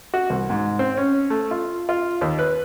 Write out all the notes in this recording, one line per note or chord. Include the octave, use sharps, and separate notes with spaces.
F#4
C2
G#2
C4
C#4
A3
F4
F4
D#2
B4